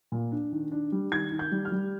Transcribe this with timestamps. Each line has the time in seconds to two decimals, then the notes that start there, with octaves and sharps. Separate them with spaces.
0.12 A#2
0.32 D4
0.52 D#3
0.72 D4
0.92 G3
1.12 D#3 G#6
1.32 D#3
1.39 G6
1.52 G3
1.65 F6
1.72 G3